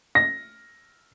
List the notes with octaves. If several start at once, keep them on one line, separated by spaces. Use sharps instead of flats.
A#6